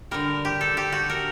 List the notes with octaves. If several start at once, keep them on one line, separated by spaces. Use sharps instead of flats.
D3 G3 A#4
G4
A4
G4
F#4
A#4